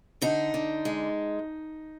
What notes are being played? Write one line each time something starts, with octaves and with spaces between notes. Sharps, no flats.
D3 D#4
D3
G#3